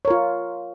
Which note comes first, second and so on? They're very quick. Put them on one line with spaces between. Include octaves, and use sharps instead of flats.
C#5 A#4 F4